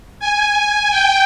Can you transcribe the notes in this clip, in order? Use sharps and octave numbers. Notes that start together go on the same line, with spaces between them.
G#5
G5